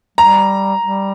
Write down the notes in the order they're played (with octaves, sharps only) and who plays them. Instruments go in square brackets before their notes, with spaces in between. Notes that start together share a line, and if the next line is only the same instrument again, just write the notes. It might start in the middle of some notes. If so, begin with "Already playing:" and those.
[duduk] G3 [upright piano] A#5
[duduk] G3